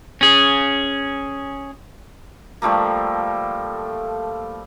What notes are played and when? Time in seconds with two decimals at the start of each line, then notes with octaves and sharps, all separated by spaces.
0.21 C#4 G#4
2.62 F3 G3 A3 A#3